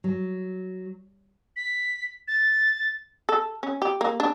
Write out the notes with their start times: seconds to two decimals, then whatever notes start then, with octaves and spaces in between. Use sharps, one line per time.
0.04 F#3
1.56 B6
2.28 A6
3.29 A4
3.63 C#4
3.82 G4
4.01 A#3
4.20 D4